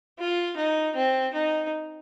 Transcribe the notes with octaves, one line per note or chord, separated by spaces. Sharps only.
F4
D#4
C4
D#4